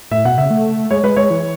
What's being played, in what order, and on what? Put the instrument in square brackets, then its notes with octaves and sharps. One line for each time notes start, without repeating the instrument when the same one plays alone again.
[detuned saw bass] A2 [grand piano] E5
[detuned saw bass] B2 [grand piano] F#5
[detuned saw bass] C#3 [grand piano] E5
[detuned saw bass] A3
[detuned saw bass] G#3 [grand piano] C#5
[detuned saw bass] G#3 [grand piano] B4
[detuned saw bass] G#3 [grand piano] C#5
[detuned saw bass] E3